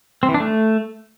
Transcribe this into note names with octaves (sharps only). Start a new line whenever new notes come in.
C4
E3
D4
A3